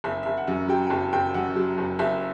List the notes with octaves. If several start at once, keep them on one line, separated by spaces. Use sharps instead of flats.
F#1 E5
E5
F#1
F#5
F#2
F#3 G5
G5
F#1 A5
F#1 G5
F#2 F#5
F#3
F#1
F#1 E5